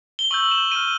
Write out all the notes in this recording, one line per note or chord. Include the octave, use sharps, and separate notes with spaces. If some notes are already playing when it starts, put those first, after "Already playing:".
G7
C#6 E6 G6 F#7
E7
C#6 F6 D#7